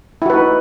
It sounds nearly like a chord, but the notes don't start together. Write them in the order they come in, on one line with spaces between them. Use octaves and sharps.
E4 F#4 B4 D#4